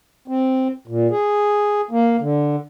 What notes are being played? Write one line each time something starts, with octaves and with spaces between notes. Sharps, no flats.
C4
A#2
G#4
A#3
D3